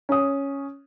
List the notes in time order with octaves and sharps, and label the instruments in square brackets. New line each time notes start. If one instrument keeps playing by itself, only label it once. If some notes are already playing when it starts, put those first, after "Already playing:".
[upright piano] C#4 D#6